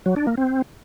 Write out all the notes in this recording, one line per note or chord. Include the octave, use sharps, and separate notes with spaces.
F#3
D4
A#3
C4